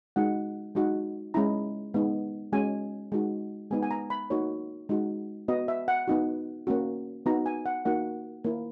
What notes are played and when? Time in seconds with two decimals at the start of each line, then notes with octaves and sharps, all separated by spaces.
0.16 G#3 D#4 F#4 F#5
0.75 G#3 D#4 F#4
1.34 G#3 C#4 E4 A#5
1.94 G#3 B3 D#4
2.53 G#3 C#4 F#4 G#5
3.12 G#3 D#4 F#4
3.71 G#3 B3 D#4 G#5
3.83 G#5
3.91 A#5
4.10 B5
4.30 A#3 D#4 F#4 C#5
4.89 G#3 D#4 F#4
5.48 B3 F#4 D#5
5.68 E5
5.88 F#5
6.08 B3 D#4 F#4
6.67 A#3 C#4 F#4
7.26 B3 D#4 F#4 A#5
7.46 G#5
7.66 F#5
7.85 A#3 D#4 F#4 F#5
8.44 A#3 E4